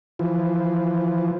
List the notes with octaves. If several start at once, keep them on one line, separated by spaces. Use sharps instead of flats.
E3 F3